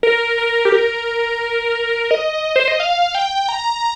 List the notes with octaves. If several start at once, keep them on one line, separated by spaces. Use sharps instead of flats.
A#4
A#4
G4
A#4
D#5
C5
D#5
F5
G5
A#5